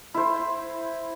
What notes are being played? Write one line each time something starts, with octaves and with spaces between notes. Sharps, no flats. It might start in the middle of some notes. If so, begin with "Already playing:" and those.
E4 C5